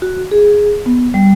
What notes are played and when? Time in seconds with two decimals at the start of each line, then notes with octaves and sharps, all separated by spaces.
0.02 F#4
0.31 G#4
0.86 B3
1.14 G3